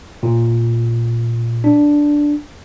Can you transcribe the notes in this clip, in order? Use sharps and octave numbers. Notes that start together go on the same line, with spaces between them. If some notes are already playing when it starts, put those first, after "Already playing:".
A#2
D4